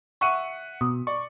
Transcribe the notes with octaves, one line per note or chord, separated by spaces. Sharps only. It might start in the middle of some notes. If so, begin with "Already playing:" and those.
E5 F#5 C#6 D#7
B2 D#6
D5 C#6